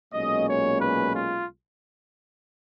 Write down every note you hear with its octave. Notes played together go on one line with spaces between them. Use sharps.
B1 A#2 G#3 C#4 D#5
C#5
B4
F4